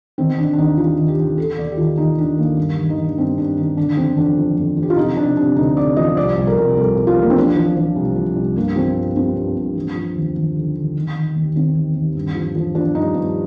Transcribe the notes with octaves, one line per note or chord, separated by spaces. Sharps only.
D#3 C4
D#3 D4
D4
D#2 D#4
D#3 F4
D#3
G4
D#3
D#3 A4
D#2 D5
G4
D#3 F4
D#2 D#4
D#2 D4
D#3 A#3
G2
D#3
D#4
D#3
D4
G2 C4
G2 D4
D#3 D#4
D3 D4
F2 C4
F2 D4
F3
F2
F2
G4
F4
C3 D#4
C3 D4
C3 D4
D2 D#4
C3 D5
F3 D#5
C2 D5
C2
A#4
C2
C2 A4
C2
F4
F3
A#3
C4
F3 D4
F3
F3
C2
F3
C2
G2 A#3
F3 C4
G2
G2 C4
G2
G2
F3
F3
D#2
D#2
D3
D3
D#3
D#3
D#2
D#2 C4
D#3
D#2
G2
F3
F3
F3 D4
G2 D#4
G2